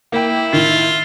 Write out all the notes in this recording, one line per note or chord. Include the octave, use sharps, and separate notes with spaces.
A#3 E4 G5
A2 D#3 F4